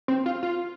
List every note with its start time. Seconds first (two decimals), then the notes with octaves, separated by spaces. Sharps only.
0.08 C4
0.26 F4
0.43 F4